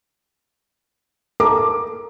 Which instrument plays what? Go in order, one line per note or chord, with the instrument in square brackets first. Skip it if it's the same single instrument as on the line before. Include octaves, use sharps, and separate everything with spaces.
[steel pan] A4 A#4 [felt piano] D6